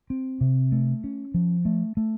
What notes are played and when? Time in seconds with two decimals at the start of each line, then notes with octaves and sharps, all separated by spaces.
0.10 C4
0.41 C3
0.72 A3
1.04 C#4
1.34 F3
1.65 A3
1.97 A3